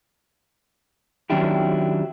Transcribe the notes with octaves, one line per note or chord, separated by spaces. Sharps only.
D#3 F#3 C#4 D4 E4 G4